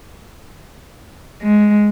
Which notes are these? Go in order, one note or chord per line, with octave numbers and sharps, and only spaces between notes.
G#3